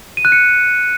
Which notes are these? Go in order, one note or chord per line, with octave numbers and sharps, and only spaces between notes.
D#7
F#6
C#7